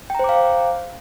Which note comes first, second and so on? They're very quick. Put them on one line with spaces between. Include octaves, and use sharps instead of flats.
G5 A#5 C5 D6 F5